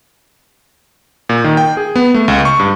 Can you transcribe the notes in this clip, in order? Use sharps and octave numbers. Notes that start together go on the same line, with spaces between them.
A#2
D#3
G5
G#4
B3
A3
C#2
C#6
G2